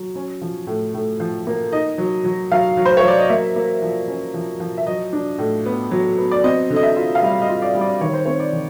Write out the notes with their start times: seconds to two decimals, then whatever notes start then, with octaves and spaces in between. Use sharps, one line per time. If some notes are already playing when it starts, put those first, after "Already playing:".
Already playing: F#3
0.15 C#4
0.41 F3
0.67 A2
0.94 A2
1.20 F3
1.47 A#3
1.72 D#4 D#5
1.98 F#3
2.24 F#3
2.52 F#3 F5
2.77 F#3
2.86 C5
2.97 C#5
3.03 F#3 D5
3.19 D#5
3.29 A#3 E5
3.56 A#3
3.82 F3
4.08 C#4
4.34 F3
4.60 F3
4.78 E5
4.86 F#3 D#5
5.13 D4
5.38 A2
5.66 B3
5.91 F#3
6.18 B3
6.31 D5
6.44 C4 D#5
6.70 D3
6.76 D#5
6.83 E5
6.96 F4
7.15 F5
7.22 G3 E5
7.42 D#5
7.49 F4
7.62 D5
7.75 G3
7.81 D5
8.01 D#3 C#5
8.14 C5
8.25 C4 C#5
8.40 D5
8.53 D#3